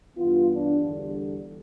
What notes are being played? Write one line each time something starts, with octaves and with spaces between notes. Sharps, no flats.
G2 E3 B3 F4
D4
E2 D3 G3